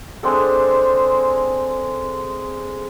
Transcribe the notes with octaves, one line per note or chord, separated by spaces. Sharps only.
G#3 C4 D4 A4